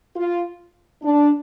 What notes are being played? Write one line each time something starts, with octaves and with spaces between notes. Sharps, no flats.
F4
D4